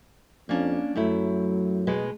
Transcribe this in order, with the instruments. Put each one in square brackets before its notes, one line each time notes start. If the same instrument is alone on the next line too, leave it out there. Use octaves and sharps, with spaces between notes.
[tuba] F2 [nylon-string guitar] A#3 C#4 D4
[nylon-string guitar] F#2 A3 E4 [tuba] F#3
[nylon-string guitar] B2 G#3 B4